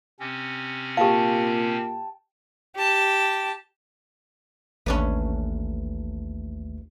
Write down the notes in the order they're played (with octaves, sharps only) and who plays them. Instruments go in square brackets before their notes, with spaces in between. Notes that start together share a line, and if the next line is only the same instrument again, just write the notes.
[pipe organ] C3 C4 C#4
[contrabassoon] A#2 [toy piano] G4 F5 [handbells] G5 A5
[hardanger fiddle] G4 A5
[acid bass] A1 [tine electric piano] D#2 A3 [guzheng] C#4 D4 B4